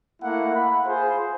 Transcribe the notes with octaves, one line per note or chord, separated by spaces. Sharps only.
A3 A#3 E4 F#5
B5
F4 G#4 C5